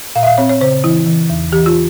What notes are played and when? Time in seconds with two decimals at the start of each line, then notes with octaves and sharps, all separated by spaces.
0.16 A#2 F5
0.23 E5
0.27 F5
0.38 C4 C#5
0.50 C#5
0.61 C#3 C5
0.84 E3 E4
1.07 E3
1.30 E2
1.53 E3 G4
1.66 F4